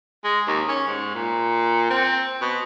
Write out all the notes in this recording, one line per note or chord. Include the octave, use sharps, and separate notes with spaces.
G#3
D#2
C#4
G#2
A#2
C4
B2